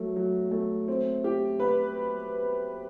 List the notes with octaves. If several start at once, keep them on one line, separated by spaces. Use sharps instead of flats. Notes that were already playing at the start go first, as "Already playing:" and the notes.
Already playing: F#3 A3
F#3
A3
C4
G4
B4